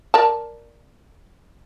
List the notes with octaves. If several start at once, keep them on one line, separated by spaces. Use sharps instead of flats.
A#4 D5 A5